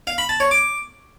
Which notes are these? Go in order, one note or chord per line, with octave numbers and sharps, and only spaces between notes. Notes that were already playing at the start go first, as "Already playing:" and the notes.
F5
B5
A5
C#5
D6